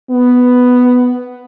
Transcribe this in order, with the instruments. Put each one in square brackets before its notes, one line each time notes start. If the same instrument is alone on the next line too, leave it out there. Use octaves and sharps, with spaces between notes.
[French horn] B3